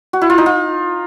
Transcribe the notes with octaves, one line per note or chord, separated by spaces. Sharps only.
F#4
E4
F4
D#4
F4